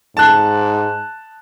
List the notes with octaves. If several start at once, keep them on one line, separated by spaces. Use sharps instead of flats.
G#2 A5 F#6